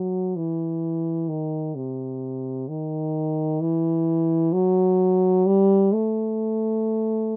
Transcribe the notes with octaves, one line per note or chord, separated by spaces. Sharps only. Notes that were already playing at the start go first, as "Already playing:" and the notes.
Already playing: F#3
E3
D#3
C3
D#3
E3
F#3
G3
A3